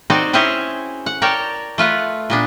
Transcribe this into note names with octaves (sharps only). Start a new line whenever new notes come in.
C4 D#4 F#4 C5 D5
C4 C#4 E4 G#4 C5 C#5
F#5
A#4 C#5 D5 G5 A5
A3 F4 B4 F#5
A#2 B3 D4